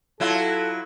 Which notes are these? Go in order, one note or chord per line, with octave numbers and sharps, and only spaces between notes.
F#3 E4 F4 A4